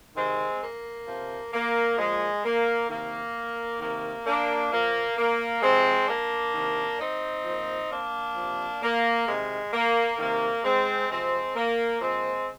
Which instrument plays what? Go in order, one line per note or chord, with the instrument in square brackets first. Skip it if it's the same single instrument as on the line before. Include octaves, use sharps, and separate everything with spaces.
[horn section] C3 D#3 G#3 C4
A#3
C3 F3
A#3
A#2 F3 G#3
A#3
C3 D#3 A#3
C3 D#3 A#3
A#3 D4
A#2 F3 A#3
A#3
C3 F3 G#3 C4
A#3 D4
C3 D#3
C4 D#4
A#2 F3
A#3 D4
C3 F3
A#3
C3 D#3 G#3
A#3
C3 D#3 A#3
G#3 C4
C3 F3 G#3 C4
A#3
A#2 F3 G#3 C4